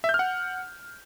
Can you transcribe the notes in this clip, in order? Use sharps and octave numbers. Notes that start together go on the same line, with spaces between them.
E5
G6
F6
F#5